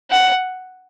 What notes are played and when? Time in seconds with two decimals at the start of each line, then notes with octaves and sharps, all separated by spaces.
0.11 F#5